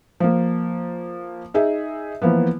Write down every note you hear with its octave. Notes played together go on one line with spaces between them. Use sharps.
F3 A#3
D#4 G#4 E5
E3 F3 A#3 B3